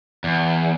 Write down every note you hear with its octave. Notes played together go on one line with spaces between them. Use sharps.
E2